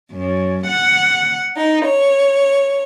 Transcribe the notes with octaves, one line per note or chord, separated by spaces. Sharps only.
F#2
F#5
D#4
C#5